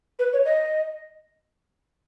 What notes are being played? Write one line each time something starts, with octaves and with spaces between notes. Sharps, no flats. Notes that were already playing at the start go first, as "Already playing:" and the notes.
B4
C#5
D#5